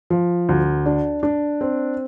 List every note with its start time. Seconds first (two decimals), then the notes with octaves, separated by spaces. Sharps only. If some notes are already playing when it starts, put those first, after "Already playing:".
0.10 F3
0.49 D2
0.86 D4
1.23 D4
1.61 C4